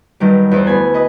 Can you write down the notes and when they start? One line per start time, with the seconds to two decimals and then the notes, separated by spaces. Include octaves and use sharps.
0.20 G2 D#3 F#3 G3
0.51 E2 E4 C5
0.66 D2 B3 G#5 B5
0.94 B4 D#5